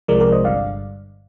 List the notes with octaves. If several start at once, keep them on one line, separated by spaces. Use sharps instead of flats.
C2 C3 F3 G#3 A#4 D5
A#4 D5
C5 D#5
G1 G2 D3 D5 F5